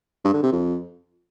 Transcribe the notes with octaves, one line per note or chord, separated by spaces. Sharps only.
G2
D3
C3
F2